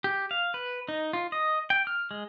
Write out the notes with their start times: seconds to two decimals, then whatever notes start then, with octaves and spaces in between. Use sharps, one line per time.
0.04 G4
0.31 F5
0.54 B4
0.88 D#4
1.13 F4
1.32 D#5
1.70 G5
1.87 F6
2.11 G#3